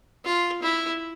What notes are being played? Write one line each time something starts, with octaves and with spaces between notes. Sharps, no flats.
F4
E4